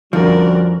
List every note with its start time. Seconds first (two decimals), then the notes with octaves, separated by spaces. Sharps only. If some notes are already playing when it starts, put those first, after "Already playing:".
0.13 F2 D3 F3 G3 C#4 F#4 A#4 D5